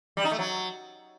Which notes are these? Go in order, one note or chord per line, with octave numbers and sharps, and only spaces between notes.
G3
D#4
A3
F#3